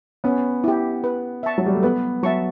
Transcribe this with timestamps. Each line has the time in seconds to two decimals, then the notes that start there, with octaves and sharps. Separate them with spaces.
0.24 B3 C#4
0.64 E4 G4
1.04 B4
1.43 E5 A5 C#6
1.58 F#3
1.66 G3
1.75 A3
1.83 B3 B4
2.23 F#3 E5 A5 C#6